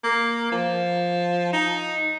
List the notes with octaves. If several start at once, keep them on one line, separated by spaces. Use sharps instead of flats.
A#3
F3
D#4